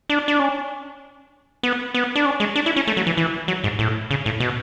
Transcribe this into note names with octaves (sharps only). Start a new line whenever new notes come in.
D4
D4
C#4
B3
B3
D4
C#4
G#3
D4
E4
C#4
A3
F#3
E3
E3
F#3
G#2
A2
C#3
A2
B2